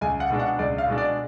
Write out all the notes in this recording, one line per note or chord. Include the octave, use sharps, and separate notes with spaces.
C#2 G#5
F#5
B2 G#3 D4
F#5
C#2 D5
F5
B2 G#3 D4
D5